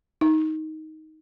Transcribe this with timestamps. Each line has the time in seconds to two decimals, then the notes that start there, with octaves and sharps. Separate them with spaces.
0.21 D#4